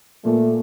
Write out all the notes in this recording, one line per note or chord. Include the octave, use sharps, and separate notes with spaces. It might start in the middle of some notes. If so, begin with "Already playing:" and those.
A#2 A3